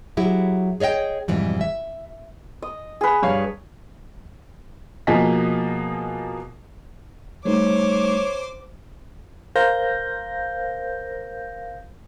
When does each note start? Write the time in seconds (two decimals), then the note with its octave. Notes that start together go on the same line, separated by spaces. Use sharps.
0.17 F#3 E4 G4 G#4
0.80 G#4 C#5 D#5 E5 G5
1.28 F2 G#2 B2 E3 G3
1.61 E5
2.62 D#5
3.01 G#4 B4
3.23 G2 C#5 F5
5.07 B2 F3 A#3 G#4 D#5 B6
7.45 G3 A3 D#4 C5 C#5 D6
9.56 A#4 C5 F5 G6 A#6